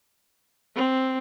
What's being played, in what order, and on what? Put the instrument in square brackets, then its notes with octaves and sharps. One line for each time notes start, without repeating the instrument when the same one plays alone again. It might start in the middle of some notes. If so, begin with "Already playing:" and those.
[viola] C4